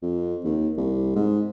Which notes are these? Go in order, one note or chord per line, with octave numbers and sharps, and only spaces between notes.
F2
D#2
C2
G#2